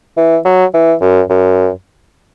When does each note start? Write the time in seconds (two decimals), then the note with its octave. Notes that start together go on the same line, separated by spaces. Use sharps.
0.17 E3
0.45 F#3
0.74 E3
1.01 F#2
1.30 F#2